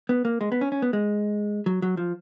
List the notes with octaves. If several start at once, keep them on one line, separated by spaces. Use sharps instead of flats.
B3
A#3
G#3
B3
C#4
C#4
B3
G#3
F#3
F#3
F3